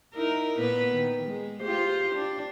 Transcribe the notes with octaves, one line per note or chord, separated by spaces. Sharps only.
D#4 E4 A#4
A#2 B3 B4
D#3
G#3
F4 G4 C5
D4